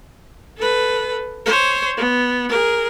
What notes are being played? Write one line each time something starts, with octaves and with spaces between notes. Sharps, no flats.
A4 B4
C5 C#5
B3
G#4 A#4